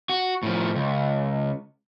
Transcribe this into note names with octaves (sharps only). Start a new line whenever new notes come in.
F#4
A2 F3
C#2